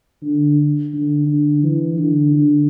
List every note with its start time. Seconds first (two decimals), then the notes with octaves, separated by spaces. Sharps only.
0.23 D3
0.93 D3
1.28 D3
1.63 E3
1.99 D3
2.34 D3